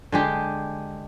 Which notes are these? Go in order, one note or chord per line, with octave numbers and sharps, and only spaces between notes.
D3 G#3 G4